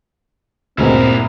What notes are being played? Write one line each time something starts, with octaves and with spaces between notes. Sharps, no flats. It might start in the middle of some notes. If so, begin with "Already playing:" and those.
D2 G2 A#2 G#3 B3 C4 E4 A#4